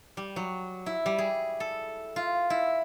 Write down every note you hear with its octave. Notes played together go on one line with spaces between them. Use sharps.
G3
F#3
E4
G3
G#4
A4
F4
E4